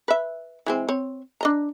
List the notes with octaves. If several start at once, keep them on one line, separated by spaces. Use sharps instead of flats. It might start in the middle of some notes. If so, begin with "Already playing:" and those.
B4 E5
E3 G#3 C4
C4 C#5
D4 D#5 A#5